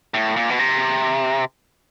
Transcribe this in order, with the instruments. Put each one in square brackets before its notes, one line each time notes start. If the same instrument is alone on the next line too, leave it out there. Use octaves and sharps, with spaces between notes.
[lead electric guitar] A2
A#2
B2
C3